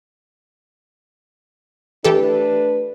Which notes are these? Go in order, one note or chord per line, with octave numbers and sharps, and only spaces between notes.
E3 A3 D4 G4 A4 B4